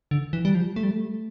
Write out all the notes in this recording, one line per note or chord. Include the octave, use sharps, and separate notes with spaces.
D3
E3
G3
F3
A3
G3
A3